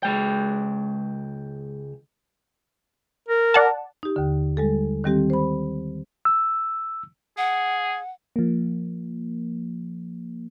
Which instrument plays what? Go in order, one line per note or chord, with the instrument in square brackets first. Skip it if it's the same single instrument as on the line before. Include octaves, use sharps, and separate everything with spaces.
[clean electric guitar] C#2 G#3 G5
[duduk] A#4
[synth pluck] D5 F#5 A5
[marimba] D#4 G4
D#2 D3
G3 G#3 A4
D#3 G3 C4 G4
C5 B5
[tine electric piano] E6
[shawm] G#4 [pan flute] F#5
[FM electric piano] F3 A#3